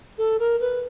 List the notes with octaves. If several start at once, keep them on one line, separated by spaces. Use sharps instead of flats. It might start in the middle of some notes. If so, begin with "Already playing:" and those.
A4
A#4
B4